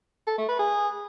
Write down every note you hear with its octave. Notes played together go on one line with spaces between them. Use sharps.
A4
A3
B4
G#4